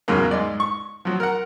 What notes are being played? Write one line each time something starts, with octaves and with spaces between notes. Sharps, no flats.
E2 G#2 C#3 F#3 A#3
G#2 G#3 D5
C#6
F3 F#3
A#4 F#5